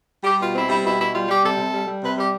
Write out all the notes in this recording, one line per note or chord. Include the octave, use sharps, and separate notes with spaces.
G3 G4
B2 F4
C4 E4
G3 E4
B2 E4
B2 E4
G3 F4
G3 G4
C3 A4
C3
G3
G3
C3 B4
G3 G4